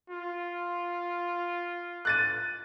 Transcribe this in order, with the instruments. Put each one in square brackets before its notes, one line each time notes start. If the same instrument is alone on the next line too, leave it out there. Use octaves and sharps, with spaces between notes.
[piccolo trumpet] F4
[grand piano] F#6 A6 D#7